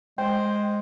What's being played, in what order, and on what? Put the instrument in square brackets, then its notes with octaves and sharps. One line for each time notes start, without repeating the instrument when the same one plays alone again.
[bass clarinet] G#3 [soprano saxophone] C5 [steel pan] G5